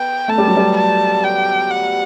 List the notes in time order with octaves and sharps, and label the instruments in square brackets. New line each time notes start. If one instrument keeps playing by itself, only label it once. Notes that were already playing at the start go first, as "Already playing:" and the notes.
Already playing: [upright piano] B3 [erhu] G5
[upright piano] A3 [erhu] A5
[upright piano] G3
F#3
G3
[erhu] A5
G5
F#5